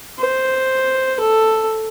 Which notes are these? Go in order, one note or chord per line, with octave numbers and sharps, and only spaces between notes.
C5
A4